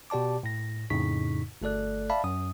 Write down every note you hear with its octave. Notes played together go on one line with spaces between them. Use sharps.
B2 G4 D5 A5 D6
A2 A#6
F2 A2 C#3 D#4 C#6 B6
G1 A3 A4 D5 F#6
D5 E5 F5 A5 B5
F#2 D#6